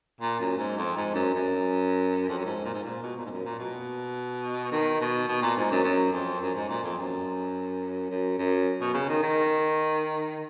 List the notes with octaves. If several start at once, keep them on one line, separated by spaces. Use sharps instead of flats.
A#2
F#2
G#2
F2
G#2
F#2
F#2
F2
F#2
G#2
A#2
G#2
A#2
B2
A#2
G#2
F#2
A#2
B2
D#3
B2
B2
A#2
G#2
F#2
F#2
F2
F#2
G#2
A#2
F2
F#2
F#2
F#2
B2
C#3
D#3
D#3